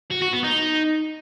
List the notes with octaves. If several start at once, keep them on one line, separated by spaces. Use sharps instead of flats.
F#4
F#4
B3
D#4